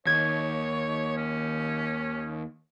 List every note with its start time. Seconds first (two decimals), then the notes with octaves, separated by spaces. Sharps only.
0.07 D#2 C#5 G#6
1.17 C#4